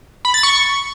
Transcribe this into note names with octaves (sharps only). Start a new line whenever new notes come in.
B5
A6
C#6